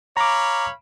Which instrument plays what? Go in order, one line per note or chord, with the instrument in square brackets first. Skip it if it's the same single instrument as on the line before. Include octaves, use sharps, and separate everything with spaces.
[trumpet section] C#5 F5 B5 [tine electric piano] A#5 D6